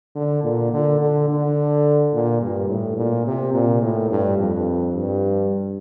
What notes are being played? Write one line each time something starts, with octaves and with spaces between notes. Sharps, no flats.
D3
A#2
D3
D3
D3
A#2
G2
A2
A#2
C3
A#2
A2
G2
F2
G2